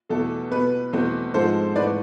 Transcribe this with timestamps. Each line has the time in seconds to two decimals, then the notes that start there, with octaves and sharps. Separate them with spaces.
0.09 E2 B2 A3 A4
0.51 B2 B3 B4
0.93 E2 B2 A3 C4
1.34 G#2 F3 G#3 C4 A4 C5
1.76 G#2 E3 A3 B4 D5